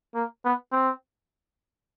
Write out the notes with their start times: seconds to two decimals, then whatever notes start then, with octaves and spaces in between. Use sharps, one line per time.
0.15 A#3
0.45 B3
0.72 C4